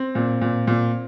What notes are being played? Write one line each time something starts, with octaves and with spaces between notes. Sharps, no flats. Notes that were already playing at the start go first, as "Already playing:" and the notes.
Already playing: C4
A#2
A#2
A#2